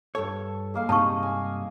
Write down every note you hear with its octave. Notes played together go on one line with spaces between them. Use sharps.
G2 A4 C#5
G#3 A#3 F5
G2 C3 D#4 D#5 A5 C#6
G#5